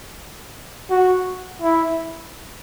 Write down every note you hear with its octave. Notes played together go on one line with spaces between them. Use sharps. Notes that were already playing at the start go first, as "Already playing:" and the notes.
F#4
E4